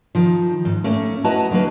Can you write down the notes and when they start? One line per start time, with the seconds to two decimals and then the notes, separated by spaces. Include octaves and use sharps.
0.15 D#3 F3
0.65 G#2
0.84 A3 A#3 C#4
1.24 E4 F#4 B4 D#5 A5 A#5
1.51 D3 F#3 A#3 B4